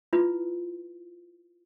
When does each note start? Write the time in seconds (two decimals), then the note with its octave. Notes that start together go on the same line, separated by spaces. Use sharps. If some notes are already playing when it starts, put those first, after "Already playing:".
0.13 E4 F4 B4